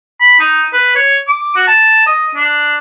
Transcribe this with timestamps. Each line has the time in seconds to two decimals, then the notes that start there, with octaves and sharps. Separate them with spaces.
0.21 B5
0.40 D#4
0.73 B4
0.96 C#5
1.28 D6
1.56 F#4
1.67 A5
2.06 D#5
2.35 D4